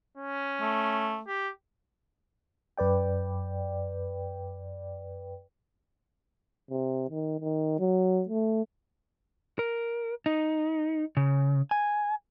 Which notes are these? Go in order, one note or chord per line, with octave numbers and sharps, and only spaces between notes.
C#4
A3
G4
F#2 B4 D5 G5
C3
D#3
D#3
F#3
A3
A#4
D#4
C#3
G#5